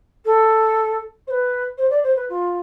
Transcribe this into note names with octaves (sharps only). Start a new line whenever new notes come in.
A4
C5
B4
C5
D5
C5
B4
F4